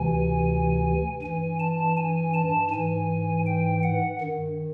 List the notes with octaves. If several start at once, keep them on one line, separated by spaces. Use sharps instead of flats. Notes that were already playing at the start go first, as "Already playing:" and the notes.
Already playing: D2 C3 E3 G#5
G2 E3 G#5
A5
G#5
A5
G#2 E3 G#5
G5
F#5
G2 D#3